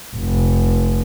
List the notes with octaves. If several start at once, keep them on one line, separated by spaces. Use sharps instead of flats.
F1